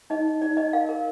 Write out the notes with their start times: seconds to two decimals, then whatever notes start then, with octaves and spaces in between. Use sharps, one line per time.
0.10 D#4 D#5
0.25 D#4
0.42 D#4 D5
0.57 D#4 D#5
0.73 A#4 F5
0.89 A#4